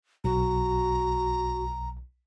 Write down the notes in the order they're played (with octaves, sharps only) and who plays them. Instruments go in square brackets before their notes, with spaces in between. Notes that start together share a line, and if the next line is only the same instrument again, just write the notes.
[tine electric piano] B1 [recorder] F#4 [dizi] A#5